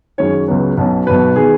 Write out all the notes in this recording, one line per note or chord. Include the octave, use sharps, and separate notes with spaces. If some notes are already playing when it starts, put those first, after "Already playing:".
F#2 D#3 G#3 C#4 C#5
C#2 C#3 F#3 B3
B1 B2 F#3 C#4
B1 B2 F#3 B4
D#3 B3 G#4